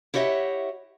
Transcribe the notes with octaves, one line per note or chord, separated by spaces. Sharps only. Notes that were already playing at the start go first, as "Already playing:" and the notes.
E4 G4 C#5 D#5 E5 F#5